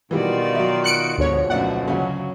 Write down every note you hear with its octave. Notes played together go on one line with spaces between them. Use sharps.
B2 D#3 E3 G3 F4 F#4 D5
F#3 E5
F#6 C#7 D7
D2 G#2 B2 F3 B3 C#5
B1 F#2 D3 A3 D5 F#5
D2 C#3 F#3 C#4